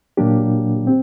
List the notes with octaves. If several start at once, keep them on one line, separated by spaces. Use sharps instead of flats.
A#2 F#3 A#3 D4 G4
C4